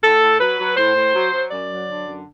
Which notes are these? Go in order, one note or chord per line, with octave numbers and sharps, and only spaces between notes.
A2 A4
A2
F#3 B4
F#3
A2 C5
A2
F#3
F#3
F#2 D5
F#3
D3
F#2